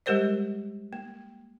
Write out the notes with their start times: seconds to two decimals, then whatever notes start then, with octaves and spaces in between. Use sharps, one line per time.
0.06 G3 G#3 G4 A#4 C5 D5
0.93 A#3